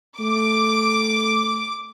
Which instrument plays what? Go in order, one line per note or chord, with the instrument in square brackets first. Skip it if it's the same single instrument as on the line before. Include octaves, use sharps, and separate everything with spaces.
[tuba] A3 [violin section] D6